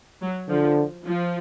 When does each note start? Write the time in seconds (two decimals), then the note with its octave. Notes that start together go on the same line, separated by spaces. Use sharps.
0.21 F#3
0.49 D3 F3
1.05 F3